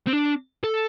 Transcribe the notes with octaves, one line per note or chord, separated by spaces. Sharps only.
C4
D4
A4